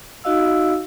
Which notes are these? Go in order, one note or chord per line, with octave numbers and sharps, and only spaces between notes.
D#4 F#4 D#5 F5 E6